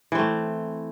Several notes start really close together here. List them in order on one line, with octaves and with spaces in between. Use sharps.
E3 C4 A3